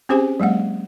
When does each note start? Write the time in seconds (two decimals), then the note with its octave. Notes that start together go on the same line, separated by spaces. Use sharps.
0.09 C4 C#4 G4 G#4 C5 G#5
0.40 F#3 G#3 A#3 F#5